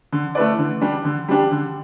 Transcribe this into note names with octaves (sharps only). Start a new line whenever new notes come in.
D3
A3 E4 B4 D5
D3
G3 D4 G4
D3
G3 D4 G4
D3